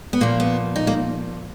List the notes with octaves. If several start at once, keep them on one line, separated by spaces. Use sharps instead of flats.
B3
A#2 F3 A#3
B3
D#4
A#3